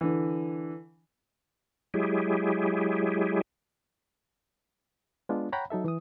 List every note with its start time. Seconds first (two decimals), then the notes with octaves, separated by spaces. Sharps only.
0.01 D3 E3
1.94 F#3 G#3 E4 G4 G#4
5.29 G#3 B3 D4 F4
5.52 C#5 F#5 G5 A#5 B5
5.70 F#3 D#4 A4 E5
5.84 E3 D#6